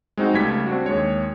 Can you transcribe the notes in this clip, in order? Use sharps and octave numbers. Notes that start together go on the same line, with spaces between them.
G#3 C4 D#4 F#4
C#2 G3 A3 G#6 B6
C4 D4 F#4
D#2 G#3 C#5